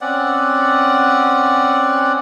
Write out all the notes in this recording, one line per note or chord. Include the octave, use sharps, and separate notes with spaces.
C4 C#4 D5 F#5